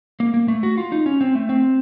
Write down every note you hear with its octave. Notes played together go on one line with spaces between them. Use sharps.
A#3
A#3
A3
F#4
F4
D#4
C#4
C4
A3
C4